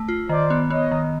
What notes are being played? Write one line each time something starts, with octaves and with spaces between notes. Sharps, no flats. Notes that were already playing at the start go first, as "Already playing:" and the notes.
Already playing: A3
F4
D#3 C5 D5
B3
B3 C#5 D#5
D#3